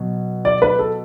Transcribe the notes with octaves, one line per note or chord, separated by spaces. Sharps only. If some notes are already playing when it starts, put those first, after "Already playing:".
Already playing: B2 F#3
D5
B4
A4